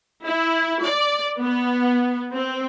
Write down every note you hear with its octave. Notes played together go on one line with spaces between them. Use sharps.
E4
D5
B3
C4